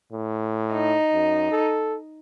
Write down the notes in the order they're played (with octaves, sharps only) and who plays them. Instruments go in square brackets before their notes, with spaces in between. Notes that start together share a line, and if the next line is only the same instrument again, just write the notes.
[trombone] A2
[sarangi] D#4
[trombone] F#2
A4